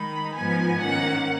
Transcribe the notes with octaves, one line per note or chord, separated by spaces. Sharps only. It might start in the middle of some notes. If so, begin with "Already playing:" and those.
Already playing: D#3 G#3 D#4 B5
G#2 F3 B3 G#5
G#2 D#3 A#3 C#4 F#5